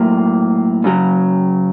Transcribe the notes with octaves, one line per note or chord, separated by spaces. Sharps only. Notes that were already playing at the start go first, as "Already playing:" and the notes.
Already playing: A2 F#3 A#3
F#2 C#3 F#3